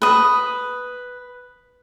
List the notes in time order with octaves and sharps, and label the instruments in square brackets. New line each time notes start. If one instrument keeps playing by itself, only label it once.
[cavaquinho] B4 D#6